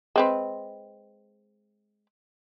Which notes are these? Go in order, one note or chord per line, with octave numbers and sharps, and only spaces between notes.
G#3 C4 B4